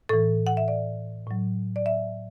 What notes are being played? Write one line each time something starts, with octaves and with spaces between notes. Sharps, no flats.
A2 E3 A4
F#5
E5
D5
A2 F#3
D5
E5